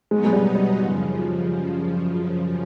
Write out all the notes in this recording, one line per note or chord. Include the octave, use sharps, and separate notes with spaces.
B2 F#3 G#3 B3 D#4
G#3
G3
G3
F#2 C#3 F3